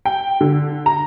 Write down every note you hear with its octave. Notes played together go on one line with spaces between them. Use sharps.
G5
D3
A#5